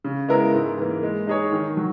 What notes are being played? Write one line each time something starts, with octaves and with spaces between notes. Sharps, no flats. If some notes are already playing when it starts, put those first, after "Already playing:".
C#3
G#3 B3 E4 A#4
G#2
E3 A#3
G#3
D#4 G#4 C#5
D#3
F#3